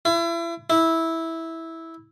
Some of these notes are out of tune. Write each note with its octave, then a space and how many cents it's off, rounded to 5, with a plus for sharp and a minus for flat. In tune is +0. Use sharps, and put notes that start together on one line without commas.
E4 +35
E4 -10